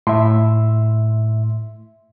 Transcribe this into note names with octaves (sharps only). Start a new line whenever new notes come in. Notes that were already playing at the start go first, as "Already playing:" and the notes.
A2 E5 C6